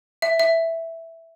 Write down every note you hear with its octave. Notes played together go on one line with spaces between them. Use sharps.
E5
E5